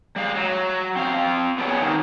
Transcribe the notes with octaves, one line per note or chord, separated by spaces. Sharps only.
G3 G#3 F5
F#3
C4 F5
B3 C#4 D4 G#4 C#5 F#5
D#3 F#3 G3 A#3 C4 D#4